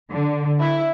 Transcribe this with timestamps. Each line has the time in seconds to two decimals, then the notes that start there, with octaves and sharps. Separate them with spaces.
0.12 D3
0.60 E4